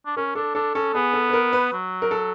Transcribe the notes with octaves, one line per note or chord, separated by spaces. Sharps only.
D4
C#4 A#4
D4 A4
D4 A4
C#4 A4
B3 G#4
A4
B4
A#4
B4
F#3
A#4
A4